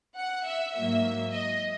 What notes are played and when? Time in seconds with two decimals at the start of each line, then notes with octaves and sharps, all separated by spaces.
0.18 F#5
0.47 E5
0.75 G#2 F#3 A#3 E5
1.32 D#5